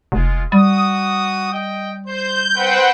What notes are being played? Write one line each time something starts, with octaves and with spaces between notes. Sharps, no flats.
F1 G#3 F4
G3 F#4 D#6
D#5 G5
C5 G6
C4 B4 C5 F#5 G5